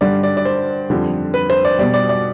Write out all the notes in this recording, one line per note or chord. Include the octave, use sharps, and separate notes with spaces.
G2 D3 G3 D5
D5
D5
C5
F2 D3 G3
B4
C5
D5
B2 G3 D5
D5
D5